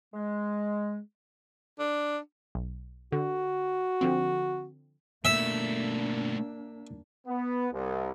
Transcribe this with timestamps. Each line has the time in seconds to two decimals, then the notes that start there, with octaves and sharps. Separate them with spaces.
0.14 G#3
1.79 D4
2.55 B1
3.12 D3 F#4
4.01 D3 F3 C4
5.25 B2 A3 A#3 D4 E5
7.27 B3
7.72 C2